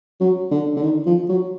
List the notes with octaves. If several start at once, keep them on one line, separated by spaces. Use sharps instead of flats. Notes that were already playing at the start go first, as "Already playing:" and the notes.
F#3
D3
D3
D#3
F3
F#3